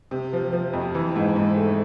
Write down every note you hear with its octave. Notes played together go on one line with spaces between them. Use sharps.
C3
F3
F3
F2
E3
G#2
G#2
A3